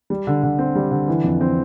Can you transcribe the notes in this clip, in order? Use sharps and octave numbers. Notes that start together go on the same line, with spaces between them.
G3
D3
D3
C4
G3
D3
E3
F2
C4